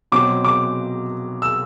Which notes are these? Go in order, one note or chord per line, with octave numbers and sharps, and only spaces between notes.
B2 F#3 C4 D6
D6
E6